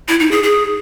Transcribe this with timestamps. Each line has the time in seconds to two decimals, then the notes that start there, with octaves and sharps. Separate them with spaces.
0.08 E4
0.20 D#4
0.31 G#4
0.43 G#4